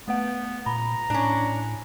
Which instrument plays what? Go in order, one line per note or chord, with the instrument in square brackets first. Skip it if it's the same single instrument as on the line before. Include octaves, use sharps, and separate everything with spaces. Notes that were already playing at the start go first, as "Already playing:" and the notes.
[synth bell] A3 B4 F#5 [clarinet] B3
[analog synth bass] A#2 [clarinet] A#5 [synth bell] B5
[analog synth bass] A2 [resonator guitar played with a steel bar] C#4 D4